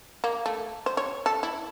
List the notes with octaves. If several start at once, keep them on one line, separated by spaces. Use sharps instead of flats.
A#3
A3
C5
C#5
A4
E4